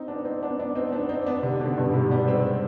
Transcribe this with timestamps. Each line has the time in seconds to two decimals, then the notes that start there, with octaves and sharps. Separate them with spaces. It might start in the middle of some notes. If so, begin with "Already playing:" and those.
Already playing: C4 D#4
0.08 B3 D4
0.25 C4 D#4
0.42 B3 D4
0.60 B3 D4
0.75 C4 D#4
0.89 D#4
0.92 B3 D4
1.09 C4 D#4
1.26 B3 D4
1.43 C3 D#3
1.60 B2 D3
1.77 G2 B2
1.94 G#2 C3
2.11 G3 B3
2.27 G#3 C4